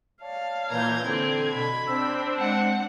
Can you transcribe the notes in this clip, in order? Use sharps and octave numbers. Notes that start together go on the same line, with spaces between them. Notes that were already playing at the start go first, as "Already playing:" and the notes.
C#5 D5 F5 A5
A#2 E3 A#5 G6 G#6
D3 C4 G#6
B2 B5
C4 D4 E6
G#3 F#5